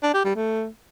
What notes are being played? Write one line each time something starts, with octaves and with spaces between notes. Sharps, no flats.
D4
G4
G3
A3